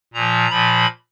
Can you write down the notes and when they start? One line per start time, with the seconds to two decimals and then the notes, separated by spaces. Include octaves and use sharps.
0.13 A#2 F3 A#5
0.50 A#2 F3 B5